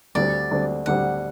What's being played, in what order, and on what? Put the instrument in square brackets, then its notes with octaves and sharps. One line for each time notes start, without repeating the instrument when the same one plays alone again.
[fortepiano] D2 D3 G3 C4 [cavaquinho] D5
[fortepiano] D2 D3 G3 C4
[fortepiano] D2 D3 G3 C4 [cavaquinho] F#5